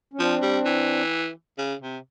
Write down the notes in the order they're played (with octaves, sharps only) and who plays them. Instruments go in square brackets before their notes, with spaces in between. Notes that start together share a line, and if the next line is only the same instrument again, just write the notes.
[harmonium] C#4
[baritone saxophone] F3 [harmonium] C4 D4
[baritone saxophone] G3
E3
C#3
C3